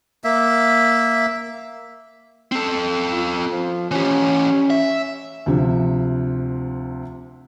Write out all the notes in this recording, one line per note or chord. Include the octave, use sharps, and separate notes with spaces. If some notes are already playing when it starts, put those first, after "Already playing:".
A#3 E5
C4 A4
F4
F3
E3 C#4 G4
E5
D2 C3 F3